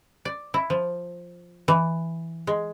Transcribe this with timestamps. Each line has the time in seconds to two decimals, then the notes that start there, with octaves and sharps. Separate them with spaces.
0.25 D5
0.54 E4
0.70 F3
1.68 E3
2.47 G#3